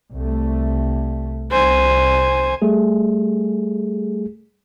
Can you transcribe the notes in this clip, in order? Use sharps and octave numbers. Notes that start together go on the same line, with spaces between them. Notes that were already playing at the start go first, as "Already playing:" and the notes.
C2 A3
C2 C5 G#5
G3 A3 G#4